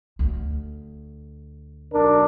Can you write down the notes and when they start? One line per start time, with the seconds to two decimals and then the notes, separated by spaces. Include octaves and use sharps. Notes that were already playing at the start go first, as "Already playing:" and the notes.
0.19 D2
1.92 B1 D4 A#4